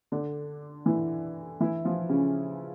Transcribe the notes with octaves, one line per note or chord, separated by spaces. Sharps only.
D3 D4
E3 E4
E3 E4
F3 F4
C#3 C#4